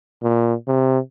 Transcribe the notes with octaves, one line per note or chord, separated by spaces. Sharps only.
A#2
C3